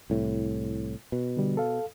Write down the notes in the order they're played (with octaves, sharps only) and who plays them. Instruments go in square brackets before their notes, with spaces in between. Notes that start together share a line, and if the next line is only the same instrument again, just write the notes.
[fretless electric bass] C2 A2
B2
[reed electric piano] D3 G3
A4 F5